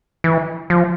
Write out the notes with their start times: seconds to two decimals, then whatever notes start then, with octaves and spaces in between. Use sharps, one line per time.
0.24 E3
0.70 F3